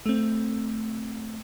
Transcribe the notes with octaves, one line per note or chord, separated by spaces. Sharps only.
A3 C4